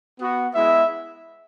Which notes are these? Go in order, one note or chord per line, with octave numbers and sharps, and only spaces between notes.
B3 F#4
G#3 B3 E4 E5